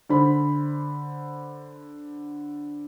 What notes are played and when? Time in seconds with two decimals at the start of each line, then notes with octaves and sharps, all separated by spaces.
0.09 D3 C5 B5